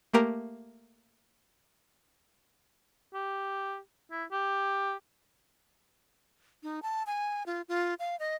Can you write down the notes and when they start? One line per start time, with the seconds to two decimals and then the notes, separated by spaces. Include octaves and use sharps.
0.13 A3 A#3 G4 A#4
3.14 G4
4.11 E4
4.32 G4
6.63 D#4
6.83 A5
7.07 G#5
7.46 F4
7.69 F4
7.99 F5
8.20 D#5